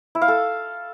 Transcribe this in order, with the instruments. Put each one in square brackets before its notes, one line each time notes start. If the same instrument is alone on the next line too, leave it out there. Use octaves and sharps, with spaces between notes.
[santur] E4
F5
A4